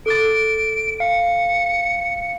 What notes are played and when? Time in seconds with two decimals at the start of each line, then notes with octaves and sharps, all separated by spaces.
0.06 A4 D6 A6 D7
1.00 F5 C#7